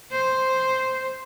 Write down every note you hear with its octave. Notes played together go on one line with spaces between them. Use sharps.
C5